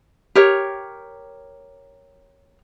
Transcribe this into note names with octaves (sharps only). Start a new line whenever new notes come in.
G4 A#4 C#5